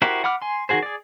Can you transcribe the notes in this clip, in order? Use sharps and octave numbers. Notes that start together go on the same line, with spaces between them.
E4 F#4 G4 A#4 C5
F#5 B5 D6 F6
G#5 C6
D#3 F3 F#4 G#4 C5
G#4 D5